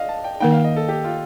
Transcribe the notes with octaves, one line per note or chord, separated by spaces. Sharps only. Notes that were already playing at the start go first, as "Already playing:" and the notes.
Already playing: D4 D#5 F5
A5
G5
D#3 A#3 D#4 G5
F5
D#5
A4
G4
F4